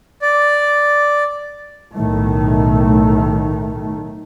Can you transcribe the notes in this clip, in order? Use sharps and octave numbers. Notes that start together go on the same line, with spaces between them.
D5
B1 A2 D#3 A3